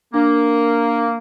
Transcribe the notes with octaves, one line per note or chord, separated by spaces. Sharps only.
A#3 D4